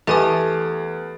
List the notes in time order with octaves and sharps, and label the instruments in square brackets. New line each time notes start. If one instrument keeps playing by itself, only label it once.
[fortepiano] E2 [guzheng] A3 [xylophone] G4 G#5 D#6